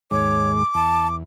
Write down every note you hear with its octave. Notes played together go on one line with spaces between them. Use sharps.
D#2 G#2 G#3 C#5 D6
E2 A5